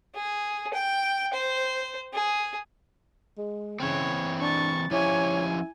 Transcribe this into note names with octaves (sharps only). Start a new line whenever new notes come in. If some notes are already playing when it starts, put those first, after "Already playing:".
G#4
G5
C5
G#4
G#3
C#3 E3 C4 C#5
D4 C#6 A6
F3 C#4 E4 G4 C#5 G#5